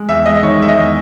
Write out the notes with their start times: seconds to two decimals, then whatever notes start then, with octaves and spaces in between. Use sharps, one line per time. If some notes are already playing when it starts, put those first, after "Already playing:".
Already playing: G#3
0.09 E2 E5
0.26 G#3 D#5
0.42 D#3 C#5
0.59 G#3 E5
0.69 D#5
0.76 E2